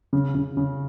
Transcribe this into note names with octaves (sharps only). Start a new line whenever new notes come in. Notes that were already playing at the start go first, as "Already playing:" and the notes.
C#3
C#3
C#3